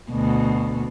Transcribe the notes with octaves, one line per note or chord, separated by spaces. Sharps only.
D2 B2